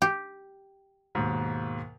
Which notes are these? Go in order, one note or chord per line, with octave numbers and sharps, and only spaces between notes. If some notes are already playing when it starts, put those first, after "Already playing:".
G4
D#2 G#2 B2